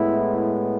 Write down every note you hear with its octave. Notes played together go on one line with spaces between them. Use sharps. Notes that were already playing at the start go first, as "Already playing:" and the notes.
Already playing: A2 G#3 B3 E4